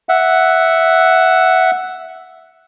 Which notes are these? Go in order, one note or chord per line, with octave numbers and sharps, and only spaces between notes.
E5 F#5